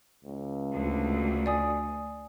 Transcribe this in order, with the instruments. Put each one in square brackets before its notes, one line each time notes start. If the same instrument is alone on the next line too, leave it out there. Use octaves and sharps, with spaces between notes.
[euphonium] C#2
[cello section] D2
[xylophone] D5 G#5 D#6